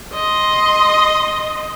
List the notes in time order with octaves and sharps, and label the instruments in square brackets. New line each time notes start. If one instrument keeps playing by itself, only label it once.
[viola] D#5 C6